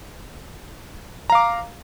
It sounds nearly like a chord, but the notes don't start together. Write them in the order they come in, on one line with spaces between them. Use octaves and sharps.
A#5 F5 D6